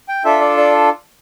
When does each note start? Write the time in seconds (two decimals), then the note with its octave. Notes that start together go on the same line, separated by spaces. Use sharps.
0.09 G5
0.25 D4 F4 A4 E5
0.41 D5
0.57 D5